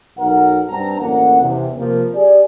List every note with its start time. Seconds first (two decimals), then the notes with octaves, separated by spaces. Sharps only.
0.18 B1 A#4 F#5
0.68 G2 C4 A5 A#5
0.99 A1 D2 A#3 F#5
1.41 E2 C3
1.76 C3 F3 A#3
2.15 G4 G#4 D5